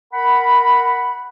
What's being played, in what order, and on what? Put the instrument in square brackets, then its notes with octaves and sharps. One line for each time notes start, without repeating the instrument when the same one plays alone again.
[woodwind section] A#4 F#5 B5